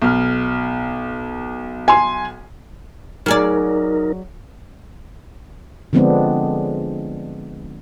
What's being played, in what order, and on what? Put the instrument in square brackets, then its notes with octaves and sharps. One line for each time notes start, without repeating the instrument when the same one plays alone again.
[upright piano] B1 F6
[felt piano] G#5 C6
[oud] F#3 G#4 D5 [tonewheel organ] D#4 A#4
[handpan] D3 F3 G#3 B3 C4 D4